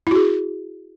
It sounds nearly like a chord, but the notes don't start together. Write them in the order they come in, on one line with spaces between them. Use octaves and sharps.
E4 F#4 G#4